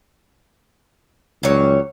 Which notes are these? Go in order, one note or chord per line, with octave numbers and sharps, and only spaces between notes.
C#2 F#3 G3 C#5